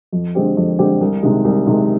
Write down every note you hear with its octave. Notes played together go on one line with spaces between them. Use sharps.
F2
D3 G#3 C4 G4
F2
D3 G#3 C4 G4
C2
C3 D#3 G#3
C2
C3 D#3 G#3